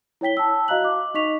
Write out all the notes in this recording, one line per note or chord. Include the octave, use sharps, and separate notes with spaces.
E4 C#5 G5 B6 G7
A5 E6
F#4 D#5 F5 A#5 F#6 F#7
D6
D#4 D#5 C#6 B6 F7